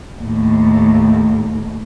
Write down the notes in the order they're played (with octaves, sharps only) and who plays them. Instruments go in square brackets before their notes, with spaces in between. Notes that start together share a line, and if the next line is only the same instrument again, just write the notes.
[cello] D#2 A2